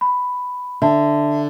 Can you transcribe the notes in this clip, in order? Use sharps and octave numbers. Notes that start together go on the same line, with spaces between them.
B5
D3 E5 A5